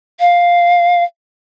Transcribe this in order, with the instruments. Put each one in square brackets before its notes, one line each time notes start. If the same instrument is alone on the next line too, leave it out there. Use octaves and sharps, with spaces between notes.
[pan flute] F5